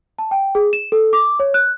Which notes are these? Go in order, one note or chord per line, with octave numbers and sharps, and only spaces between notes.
A5
G5
G#4
E7
A4
D6
C#5
F#6